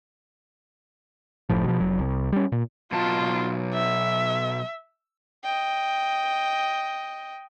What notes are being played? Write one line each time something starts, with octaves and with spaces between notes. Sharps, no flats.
F#1 A2 F3
B2 F3
F1 F#3
C2
G3 C#4
A#2
B2 F#3 F4 A5
E5
D#5 G5